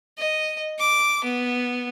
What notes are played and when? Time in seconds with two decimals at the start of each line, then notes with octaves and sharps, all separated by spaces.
0.18 D#5
0.79 D6
1.24 B3